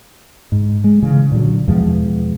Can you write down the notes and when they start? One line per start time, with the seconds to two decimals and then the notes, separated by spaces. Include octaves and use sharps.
0.52 G#2
0.84 G#3
1.02 C#3 E3
1.32 A#2 D3 D#3 F#3
1.68 E2 B2 F3 G#3